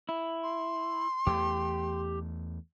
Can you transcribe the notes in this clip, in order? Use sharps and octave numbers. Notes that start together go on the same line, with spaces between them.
E4
C6
E2 A3 G4